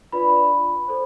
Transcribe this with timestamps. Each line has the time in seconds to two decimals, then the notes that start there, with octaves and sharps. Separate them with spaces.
0.12 D4 F4 B4 D5 B5
0.88 A4 C5